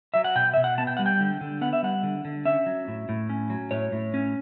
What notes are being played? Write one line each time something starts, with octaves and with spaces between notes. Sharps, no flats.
F#3 E5
F#5
B2 G5
B2 E5
F#5
B3 A5
G5
G3 F#5
G5
D3
D3
B3 F#5
E5
G3 F#5
D3
D3
C#4 E5
F#3
A2
A2
C#4
F#3
A2 C#5
A2
C#4